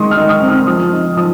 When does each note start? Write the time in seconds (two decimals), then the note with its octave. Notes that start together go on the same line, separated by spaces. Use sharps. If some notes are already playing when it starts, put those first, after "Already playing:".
Already playing: D#3 G#3 C6 C#6 D#6
0.11 F6
0.17 D#4
0.29 D#6
0.42 C4
0.49 F6
0.67 F3 D#6
0.92 D#4
1.17 F3 D#6